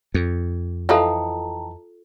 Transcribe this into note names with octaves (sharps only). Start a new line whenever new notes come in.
F2
E3 F3 D#4 F4 A4 G5 A5 A#5